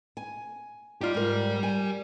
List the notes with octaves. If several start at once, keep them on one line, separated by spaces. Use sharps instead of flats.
G#5
D#4 F4 G4 D5
G#2 A#4
G#5